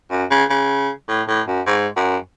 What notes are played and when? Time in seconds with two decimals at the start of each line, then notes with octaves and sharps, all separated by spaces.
0.11 F#2
0.30 C#3
0.49 C#3
1.08 A2
1.28 A2
1.47 F#2
1.67 G#2
1.96 F#2